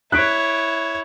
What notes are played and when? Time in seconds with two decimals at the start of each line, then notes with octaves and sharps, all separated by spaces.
0.12 E4 C#5 F#6 B6 D7